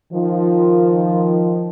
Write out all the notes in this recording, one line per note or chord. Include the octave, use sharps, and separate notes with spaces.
D#3 F3